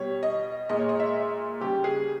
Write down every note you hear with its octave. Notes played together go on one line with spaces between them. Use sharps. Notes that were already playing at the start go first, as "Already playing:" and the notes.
Already playing: B2 G3 C#5
D#5
A#2 G#3 D#5
C#5
D#5
E5
C#3 G3 G4
G#4